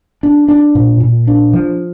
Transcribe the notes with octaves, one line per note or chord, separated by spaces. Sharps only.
D4
D4
A#2
A#2
D4
F3